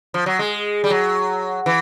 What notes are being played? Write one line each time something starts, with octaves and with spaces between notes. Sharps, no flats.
F3
F#3
G#3
G3
F#3
E3